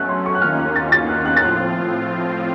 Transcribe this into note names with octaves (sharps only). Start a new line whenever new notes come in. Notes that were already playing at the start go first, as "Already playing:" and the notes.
Already playing: F#3 A3 C#4 F#6
C6
C#6
F#6
D#2 D#3 A#3 C#4 F4 F6
F#6
A6
A6
F#6
F#6
A6
A2 F3 C4 F4 F#6